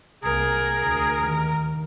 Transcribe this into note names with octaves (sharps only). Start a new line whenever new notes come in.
C2 A#3 G#4 A#4
D2
D#2 D#3